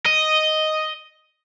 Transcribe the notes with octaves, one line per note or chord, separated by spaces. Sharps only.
D#5